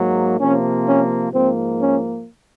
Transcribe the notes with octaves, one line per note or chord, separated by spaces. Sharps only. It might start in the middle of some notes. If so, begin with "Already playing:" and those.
Already playing: G#2 F#3 A#3
C3 F3 A#3 C#4
C#4
G#2 F3 A#3 C4
C#4